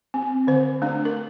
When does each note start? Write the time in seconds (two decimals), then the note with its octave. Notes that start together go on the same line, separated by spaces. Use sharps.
0.14 C4
0.47 D3 C5
0.82 A3 D4
1.05 A#4